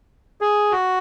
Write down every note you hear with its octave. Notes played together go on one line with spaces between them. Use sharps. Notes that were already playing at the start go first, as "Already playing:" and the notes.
G#4
F#4